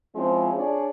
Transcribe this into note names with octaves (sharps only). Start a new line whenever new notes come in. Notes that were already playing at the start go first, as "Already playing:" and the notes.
F3 G#3 C4 C#4 E4 F4
D4 G#4 C#5 D5